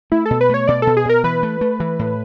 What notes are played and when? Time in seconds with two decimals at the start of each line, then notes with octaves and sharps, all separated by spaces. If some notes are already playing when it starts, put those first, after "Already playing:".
0.12 A3 E4
0.26 B2 A4
0.41 B4
0.49 A3 C#5
0.68 B2 D5
0.82 B2 A4
0.97 G#4
1.05 B2 A#4
1.24 E3 B4
1.43 A3
1.61 A3
1.80 E3
1.99 A2